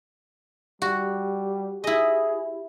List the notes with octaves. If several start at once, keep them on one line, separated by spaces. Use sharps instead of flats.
G3 F#4 G4
E4 G#4 D#5